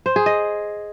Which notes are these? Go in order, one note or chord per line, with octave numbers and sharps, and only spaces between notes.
C5
G#4
D#5